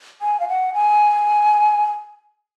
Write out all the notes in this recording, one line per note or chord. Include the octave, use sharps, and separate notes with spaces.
G#5
F5
F#5
G#5